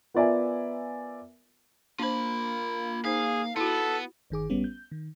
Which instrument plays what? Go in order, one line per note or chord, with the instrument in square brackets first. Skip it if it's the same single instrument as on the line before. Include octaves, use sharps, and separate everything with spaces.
[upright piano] B3 F4 A#4 D5 E5 G#5
[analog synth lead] A#3 [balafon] D4 C5 [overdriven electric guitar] F4 B5
[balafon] D#4 C5 [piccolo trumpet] G#4 [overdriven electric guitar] F5
[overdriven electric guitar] B3 [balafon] E4 F#4 [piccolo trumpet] A4
[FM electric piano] G1 D#3 G#4 D6
A1 G3 B3 C#4
G6
D#3